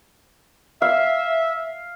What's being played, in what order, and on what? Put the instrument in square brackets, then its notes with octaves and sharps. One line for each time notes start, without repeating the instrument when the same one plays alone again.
[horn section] E5 [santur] F5